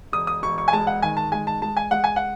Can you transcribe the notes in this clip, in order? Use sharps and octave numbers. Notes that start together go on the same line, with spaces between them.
E1 D#6
D#6
E1 C#6
C#6
G#5
G#3 A5
F#5
D#3 G#5
A5
G#3 G#5
A5
G#3 A5
G#5
G#3 F#5
G#5
F#5